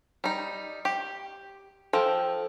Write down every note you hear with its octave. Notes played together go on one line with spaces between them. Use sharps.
G3 D#4
G4
F3 A4 G5